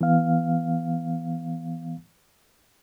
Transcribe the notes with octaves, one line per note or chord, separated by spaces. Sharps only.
E3 B3 F5